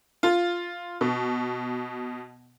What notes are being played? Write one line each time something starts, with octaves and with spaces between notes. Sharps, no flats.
F4
B2